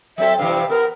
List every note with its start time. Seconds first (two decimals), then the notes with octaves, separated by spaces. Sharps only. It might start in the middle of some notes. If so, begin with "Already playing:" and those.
0.18 F#3 C4 A4 E5
0.39 G2 C3 E3 F5
0.69 B3 A#4